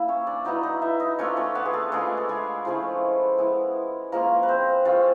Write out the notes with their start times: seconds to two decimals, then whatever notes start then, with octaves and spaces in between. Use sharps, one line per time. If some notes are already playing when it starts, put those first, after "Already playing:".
Already playing: A#3 E4 E5
0.08 C#4 C#5
0.27 D4 D5
0.45 F#3 B3 D#4 E4 D#5
0.63 D#4 D#5
0.82 E4 E5
1.00 D#4 D#5
1.19 A3 C#4 D4 F4 C#5
1.37 C#4 C#5
1.55 B3 B4
1.65 G#4
1.73 A3 A4
1.92 G#3 A3 D4 F4 G#4
2.17 A4
2.29 G#3 G#4
2.65 F3 G#3 A3 C#4 E4 A4
3.38 G#3 B3 E4
4.12 F3 G#3 A#3 C#4 F4 A#4
4.43 B4
4.48 C4 C5
4.85 G#3 C#4 F4